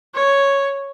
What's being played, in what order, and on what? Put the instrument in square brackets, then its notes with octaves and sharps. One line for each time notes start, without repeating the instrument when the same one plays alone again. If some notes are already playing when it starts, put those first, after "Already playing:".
[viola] C#5